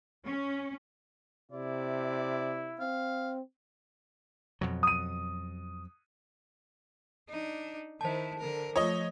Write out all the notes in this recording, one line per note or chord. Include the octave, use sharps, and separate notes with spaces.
C#4
C3 E4 D5
C4 F5
F2 B2 F#3
D#6 D#7
D4 D#4
D#3 E4 C5 A5
D3 A#4
F3 A3 F4 C#5 D#5